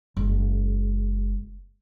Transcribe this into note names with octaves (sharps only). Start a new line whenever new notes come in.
F#1 G#3